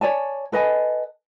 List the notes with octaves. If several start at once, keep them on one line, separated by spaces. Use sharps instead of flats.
C#5 D5 G#5 A5
A4 B4 D#5 G#5